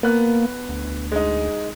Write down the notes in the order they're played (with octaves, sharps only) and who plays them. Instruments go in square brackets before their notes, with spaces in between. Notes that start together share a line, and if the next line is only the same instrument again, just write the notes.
[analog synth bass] A#3 [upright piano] B3 F#6
[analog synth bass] D2
[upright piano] G#3 D#4